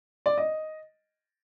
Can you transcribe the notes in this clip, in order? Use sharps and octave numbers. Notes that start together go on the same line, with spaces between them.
D5
D#5